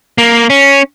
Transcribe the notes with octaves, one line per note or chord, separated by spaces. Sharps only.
A#3
C#4